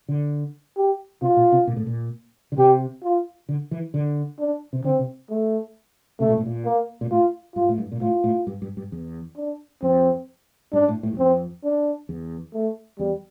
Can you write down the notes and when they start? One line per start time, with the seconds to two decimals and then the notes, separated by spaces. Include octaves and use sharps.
0.08 D3
0.77 G4
1.22 C3 F4
1.37 A#2
1.52 C3
1.67 A#2
1.76 A2
1.86 A#2
2.52 D3
2.58 C3 G4
3.03 F4
3.49 D3
3.71 E3
3.94 D3
4.39 D4
4.73 C3
4.84 D3 C4
4.99 C3
5.30 A3
6.20 C3 A3
6.29 A#2
6.38 A2
6.46 A#2
6.65 A#3
7.01 A#2
7.11 A2 F4
7.55 G2 F4
7.69 A2
7.78 G2
7.92 A#2
8.01 A2 F4
8.24 A2
8.47 G2
8.62 G2
8.77 G2
8.92 E2
9.37 D4
9.82 F2 C4
10.73 G2 D4
10.88 A2
11.03 A2
11.13 G2
11.18 F2 C4
11.64 D4
12.09 E2
12.54 A3
12.99 E2 G3